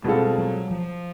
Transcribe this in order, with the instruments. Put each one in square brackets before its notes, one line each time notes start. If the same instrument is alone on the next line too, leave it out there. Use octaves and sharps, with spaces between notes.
[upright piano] B2 G#3 C4 F4 A4 [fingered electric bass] G3
[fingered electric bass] F#3
F3